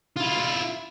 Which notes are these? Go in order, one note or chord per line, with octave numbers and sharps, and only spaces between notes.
E4 F4